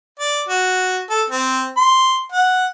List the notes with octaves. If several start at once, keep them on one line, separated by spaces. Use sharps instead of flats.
D5
F#4
A4
C4
C6
F#5